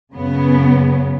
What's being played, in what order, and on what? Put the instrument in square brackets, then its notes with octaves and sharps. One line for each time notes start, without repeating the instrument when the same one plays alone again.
[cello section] F#2 C#3 B3